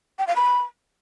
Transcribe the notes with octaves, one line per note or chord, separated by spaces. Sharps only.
G5
F5
B5